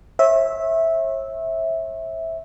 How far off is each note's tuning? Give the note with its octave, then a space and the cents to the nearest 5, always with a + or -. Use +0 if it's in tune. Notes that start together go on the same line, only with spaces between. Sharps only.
C#5 -40 E5 -10